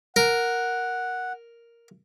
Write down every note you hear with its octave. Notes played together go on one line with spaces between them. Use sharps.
A#4 F#5